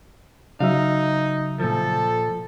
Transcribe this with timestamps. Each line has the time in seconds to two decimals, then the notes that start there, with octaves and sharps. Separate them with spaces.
0.60 C#3 F#3 D#4 E5 F5
1.60 A#2 F3 A4